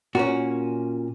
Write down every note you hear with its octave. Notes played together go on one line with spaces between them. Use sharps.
A#2 A#3 C#4 F#4